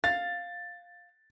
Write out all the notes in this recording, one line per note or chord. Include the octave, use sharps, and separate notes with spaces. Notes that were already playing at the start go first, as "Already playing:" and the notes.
F5 A6